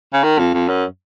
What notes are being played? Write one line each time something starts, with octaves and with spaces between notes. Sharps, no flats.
C#3
D#3
F2
F2
F#2